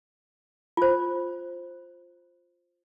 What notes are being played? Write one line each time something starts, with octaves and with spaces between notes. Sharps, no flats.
F4 C5